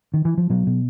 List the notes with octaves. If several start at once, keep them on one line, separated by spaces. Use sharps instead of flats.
D#3
E3
F3
B2 F#3
B2